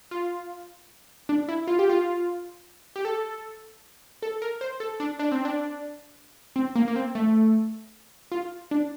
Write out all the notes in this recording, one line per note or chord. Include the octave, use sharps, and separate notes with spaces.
F4
D4
E4
F4
G4
F4
G4
A4
A4
A#4
C5
A4
D4
D4
C4
D4
C4
A#3
A#3
C4
A3
F4
D4